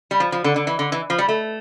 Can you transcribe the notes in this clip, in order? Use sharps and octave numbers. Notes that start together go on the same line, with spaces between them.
G3
F3
F3
D3
D3
E3
D3
E3
F3
G3
A3